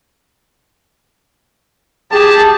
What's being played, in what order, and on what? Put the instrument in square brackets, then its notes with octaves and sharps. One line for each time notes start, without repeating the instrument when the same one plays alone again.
[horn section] G4 A5 [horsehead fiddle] G#4